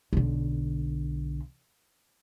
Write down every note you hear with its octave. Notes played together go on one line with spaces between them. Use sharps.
B1 D3